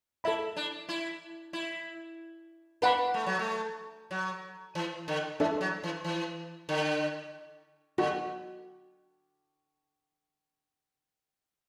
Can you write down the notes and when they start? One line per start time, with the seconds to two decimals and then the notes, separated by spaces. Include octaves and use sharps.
0.24 E4 A4 E5 B5
0.56 D4
0.89 E4
1.53 E4
2.82 D4 B4 F#5 B5
3.14 A3
3.26 F#3
3.39 A3
4.11 F#3
4.75 E3
5.08 D3
5.40 E3 D4 A4 E5
5.61 F#3
5.83 E3
6.04 E3
6.69 D3
7.98 D3 F#4